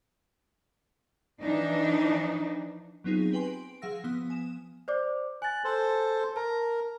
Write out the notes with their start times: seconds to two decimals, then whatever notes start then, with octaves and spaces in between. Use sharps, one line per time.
1.42 E3 F3 D4 D#4
3.04 F#3 B3 C4 D#4 F4 G#4
3.33 G4 B4 G5 G#5 C6
3.48 D7
3.82 F3 G#4 F5 F#5 E6 A#6
4.04 F3 B3 D#6
4.30 G#5 E7
4.88 C5 D5 D6
5.42 G#5 F#6 A6
5.64 A4 C5
6.36 A#4 A5